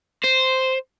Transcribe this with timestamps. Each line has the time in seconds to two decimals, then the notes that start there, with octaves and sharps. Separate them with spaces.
0.24 C5